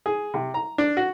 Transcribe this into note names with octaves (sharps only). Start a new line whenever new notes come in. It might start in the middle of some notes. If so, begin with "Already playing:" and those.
G#4
C3
A#5
D4
F#4